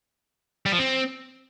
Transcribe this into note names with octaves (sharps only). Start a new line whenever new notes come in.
G3
F3
C4